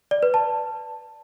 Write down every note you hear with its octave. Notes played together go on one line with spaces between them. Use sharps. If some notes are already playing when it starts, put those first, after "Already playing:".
D5
B4
A5